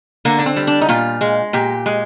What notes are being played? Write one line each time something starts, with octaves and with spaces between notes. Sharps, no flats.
D3 A#3
D4
C4
G3
D4
D#4
A#2 F4
G#3
A#2 G4
G#3